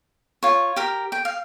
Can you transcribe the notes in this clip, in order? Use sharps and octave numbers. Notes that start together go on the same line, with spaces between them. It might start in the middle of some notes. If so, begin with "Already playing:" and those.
F4 C#5
G4 A#4
G5
F5